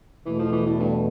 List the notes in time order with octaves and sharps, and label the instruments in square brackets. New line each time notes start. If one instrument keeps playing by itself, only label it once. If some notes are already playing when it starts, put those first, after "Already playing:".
[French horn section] E2 B2 A3 [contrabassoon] E3
[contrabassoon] F3
E3
A2
G2